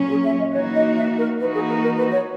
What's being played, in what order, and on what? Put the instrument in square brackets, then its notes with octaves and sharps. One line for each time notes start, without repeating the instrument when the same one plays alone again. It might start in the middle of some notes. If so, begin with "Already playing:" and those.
Already playing: [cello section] A#2 F#3 C#4
[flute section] G#4
E5
D#5
[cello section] E3 A#3 D#4 F#4 [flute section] C#5
[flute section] D#5
E5
A#4
[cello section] E3 A#3 D#4 F#4 [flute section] B4
[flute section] G#4
A#4
A#4
B4
C#5